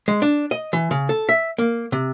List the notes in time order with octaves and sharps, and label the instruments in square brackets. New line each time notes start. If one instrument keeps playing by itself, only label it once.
[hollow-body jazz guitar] G#3
D4
D#5
E3
C#3
A4
E5
A#3
C3